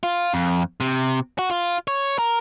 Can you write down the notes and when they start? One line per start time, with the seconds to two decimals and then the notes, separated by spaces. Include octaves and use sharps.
0.03 F4
0.34 F2
0.80 C3
1.39 F#4
1.51 F4
1.88 C#5
2.19 A#4